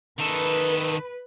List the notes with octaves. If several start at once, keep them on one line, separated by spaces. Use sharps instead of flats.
D#3 A4 B4